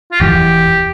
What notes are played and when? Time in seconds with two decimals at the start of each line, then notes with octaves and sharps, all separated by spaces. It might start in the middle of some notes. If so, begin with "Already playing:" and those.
0.12 F4
0.20 E1 E2 E3 G4